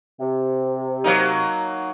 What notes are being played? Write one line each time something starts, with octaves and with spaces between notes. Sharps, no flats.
C3
F#3 A#3 D#4